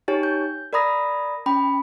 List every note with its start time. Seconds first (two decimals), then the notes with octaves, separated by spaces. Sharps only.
0.08 D#4 G4 C#5 G#5
0.23 G6
0.73 A#4 D5 A#5 B5 D#6 A#6
1.46 C#4 G5 B5